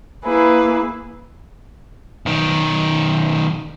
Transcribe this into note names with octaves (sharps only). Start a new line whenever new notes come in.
A#3 E4 G#4 B4
B1 D#3